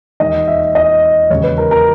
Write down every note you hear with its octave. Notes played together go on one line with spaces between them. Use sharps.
E1 D#2 D#3 D#5
E5
D#5
E1 D#2 C#3 C#5
B4
A#4
A#4